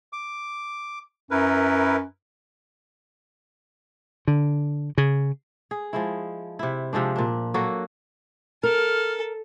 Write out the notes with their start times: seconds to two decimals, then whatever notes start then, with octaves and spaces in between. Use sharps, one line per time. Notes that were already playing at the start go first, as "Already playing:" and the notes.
0.13 D6
1.31 F#2 E4 A#4 B4
4.27 D3
4.98 C#3
5.71 G#4
5.93 F3 G#3 E4
6.59 C3 E4
6.93 C3 F3 G#3 D4
7.16 A#2 D4
7.54 F#3 A#3 F#4 A4
8.63 A4 A#4 F6